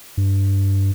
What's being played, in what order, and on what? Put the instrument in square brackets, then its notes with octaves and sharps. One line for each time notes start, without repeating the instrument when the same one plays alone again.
[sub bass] G2